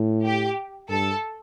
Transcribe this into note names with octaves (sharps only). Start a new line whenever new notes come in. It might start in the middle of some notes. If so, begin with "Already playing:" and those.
Already playing: A2
G4
G2 A4